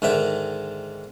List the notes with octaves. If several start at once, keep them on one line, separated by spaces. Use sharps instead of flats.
G#2 D3 D#3 E5 G5